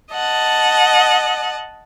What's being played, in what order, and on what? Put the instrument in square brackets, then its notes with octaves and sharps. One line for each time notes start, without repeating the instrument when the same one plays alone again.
[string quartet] D#5 F#5 A5